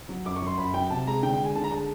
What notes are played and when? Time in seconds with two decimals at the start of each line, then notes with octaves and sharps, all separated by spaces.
0.09 F#3
0.25 F#2 D6
0.36 C#6
0.42 F#3
0.47 C6
0.58 F#2 B5
0.74 F#3 G5
0.90 C3 A5
1.07 G#3 A#5
1.23 D3 G5
1.33 G5
1.39 G#3
1.45 G#5
1.55 D3 A5
1.64 A#5
1.72 G#3 A5